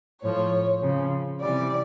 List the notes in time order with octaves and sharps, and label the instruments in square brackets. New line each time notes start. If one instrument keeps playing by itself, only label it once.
[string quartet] A2 F3 C#5
C#3 F3
C3 E3 G3 D5